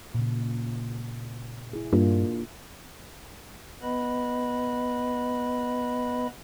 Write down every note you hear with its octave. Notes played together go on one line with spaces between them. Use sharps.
A#2 C#3
E4 G#4
G2 A#3 D4 F4
B3 B4 D#5 B5